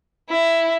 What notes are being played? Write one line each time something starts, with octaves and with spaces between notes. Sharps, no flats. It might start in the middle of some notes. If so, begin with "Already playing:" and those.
E4